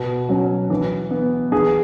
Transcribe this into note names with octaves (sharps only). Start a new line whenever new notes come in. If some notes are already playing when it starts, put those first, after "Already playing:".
Already playing: B2
F#3 C#4
E3
B3
E3 G#4